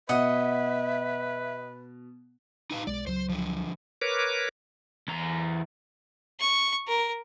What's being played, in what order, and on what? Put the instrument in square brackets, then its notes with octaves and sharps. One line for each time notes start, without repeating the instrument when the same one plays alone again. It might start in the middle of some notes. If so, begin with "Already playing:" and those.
[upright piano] B2 [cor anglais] B4 [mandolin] D#5 F#5 [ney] E5
[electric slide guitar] D#4 B4 F5
[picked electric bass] B1 G#3 [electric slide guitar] D5
[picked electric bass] C#2 F#3 [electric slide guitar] C5
[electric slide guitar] D3 F3
[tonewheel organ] A#4 B4 C#5 D6
[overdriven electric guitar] E2 A#5
[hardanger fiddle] C#6
A#4